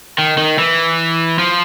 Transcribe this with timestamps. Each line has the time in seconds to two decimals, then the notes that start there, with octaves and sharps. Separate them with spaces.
0.18 D#3
0.38 D#3
0.59 E3
1.39 F3